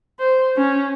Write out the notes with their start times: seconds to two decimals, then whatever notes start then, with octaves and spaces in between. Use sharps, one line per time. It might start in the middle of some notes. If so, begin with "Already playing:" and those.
0.20 C5
0.57 C#4